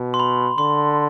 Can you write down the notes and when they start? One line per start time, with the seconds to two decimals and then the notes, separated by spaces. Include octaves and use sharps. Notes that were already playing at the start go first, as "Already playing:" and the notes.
Already playing: B2
0.14 C6
0.20 B5
0.58 D3 C6